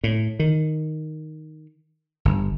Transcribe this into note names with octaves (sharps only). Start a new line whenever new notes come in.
A2
D#3
G1